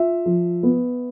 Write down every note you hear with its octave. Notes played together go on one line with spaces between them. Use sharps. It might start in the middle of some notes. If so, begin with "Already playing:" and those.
Already playing: F4 E5
F3
B3